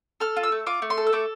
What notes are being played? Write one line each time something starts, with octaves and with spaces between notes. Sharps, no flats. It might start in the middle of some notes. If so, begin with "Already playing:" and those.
A4 F6
F4
E6
A3
F4 D6
A3
C6
A4
E6
A3 D6